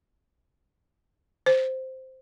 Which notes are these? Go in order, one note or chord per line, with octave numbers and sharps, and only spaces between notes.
C5